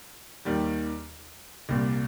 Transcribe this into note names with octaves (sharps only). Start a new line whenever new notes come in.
D#2 D#3 G3
C2 A#2 G3